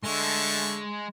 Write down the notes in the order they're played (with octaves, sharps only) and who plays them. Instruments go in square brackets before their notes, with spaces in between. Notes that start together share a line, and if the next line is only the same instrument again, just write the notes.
[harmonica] D3 A3 C#6 [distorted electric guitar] G#3